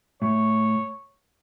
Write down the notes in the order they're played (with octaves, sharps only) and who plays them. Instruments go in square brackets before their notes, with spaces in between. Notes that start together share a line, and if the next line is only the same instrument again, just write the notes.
[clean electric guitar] A2 [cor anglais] C#5